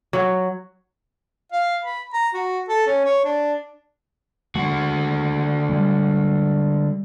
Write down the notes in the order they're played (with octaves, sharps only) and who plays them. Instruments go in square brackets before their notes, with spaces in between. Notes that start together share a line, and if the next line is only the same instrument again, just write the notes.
[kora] F#3
[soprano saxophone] F5
B5
A#5
F#4
A4
C#4
C#5
D4
[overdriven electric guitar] D3 F#4 [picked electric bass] G#3
[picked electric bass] G3 G#3